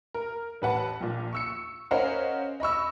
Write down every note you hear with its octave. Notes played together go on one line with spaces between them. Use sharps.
A#4
A1 B4 F#5 A5
A#1 A#2
C#6 E6 C#7
C#4 A#4 C5 D#5 F5 F#5
D#5 B5 C#6 E6